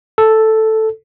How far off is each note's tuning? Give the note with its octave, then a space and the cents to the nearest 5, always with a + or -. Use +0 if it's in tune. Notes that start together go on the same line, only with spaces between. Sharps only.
A4 +0